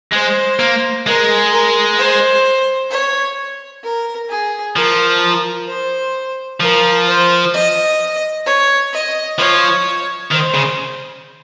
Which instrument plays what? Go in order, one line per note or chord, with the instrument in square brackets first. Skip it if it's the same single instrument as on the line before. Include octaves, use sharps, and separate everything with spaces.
[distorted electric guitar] G#3 [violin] C5
[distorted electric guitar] A#3
[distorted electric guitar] G#3 [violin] A#4
[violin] A#4
C5
C#5
A#4
G#4
[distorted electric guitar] F3 [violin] A#4
[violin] C5
[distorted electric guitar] F3 [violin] A#4
[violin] C5
D#5
C#5
D#5
[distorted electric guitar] F3 [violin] C#5
[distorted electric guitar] D#3 [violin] C5
[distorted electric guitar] C#3